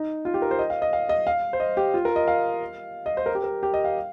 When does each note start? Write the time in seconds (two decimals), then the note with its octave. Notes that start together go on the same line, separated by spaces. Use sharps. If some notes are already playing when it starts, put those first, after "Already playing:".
Already playing: D#4
0.25 F4
0.34 G4
0.42 A#4
0.51 C5
0.59 D#5
0.70 F5
0.82 D#5
0.93 F5
1.09 D#5
1.27 F5
1.53 C5
1.60 D#5
1.77 G4
1.94 F4
2.05 A#4
2.16 D#5
2.28 F5
3.06 D#5
3.17 C5
3.26 A#4
3.35 G4
3.44 A#4
3.63 G4
3.74 D#5
3.85 F5